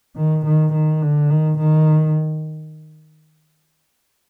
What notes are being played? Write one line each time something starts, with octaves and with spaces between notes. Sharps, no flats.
D#3
D#3
D#3
D3
D#3
D#3